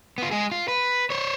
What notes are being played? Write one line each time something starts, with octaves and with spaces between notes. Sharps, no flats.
B3 F4
G#3 G#4
F4
B4
C5 C#5